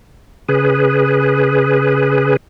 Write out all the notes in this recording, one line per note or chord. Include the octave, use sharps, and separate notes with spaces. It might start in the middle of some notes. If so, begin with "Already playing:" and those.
C#3 G#4 B4